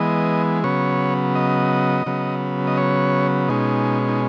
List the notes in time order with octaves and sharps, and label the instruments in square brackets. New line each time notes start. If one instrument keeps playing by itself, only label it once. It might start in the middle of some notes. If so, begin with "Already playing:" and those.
Already playing: [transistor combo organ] E3 G#3 B3 D#5
C#3 F#3 B3 C#5
D#5
C#3 F#3 B3
D#5
C#5
B2 G#3 C#4 D#4
D#4